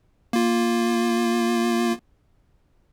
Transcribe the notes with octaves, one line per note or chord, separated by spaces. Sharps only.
A#3 F4